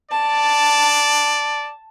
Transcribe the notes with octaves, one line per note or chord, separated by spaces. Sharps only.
D5 A5